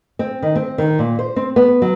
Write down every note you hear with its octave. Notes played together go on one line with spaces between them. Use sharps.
C4
D#3
C4
D#3
A#2
C5
C4
B3
F#3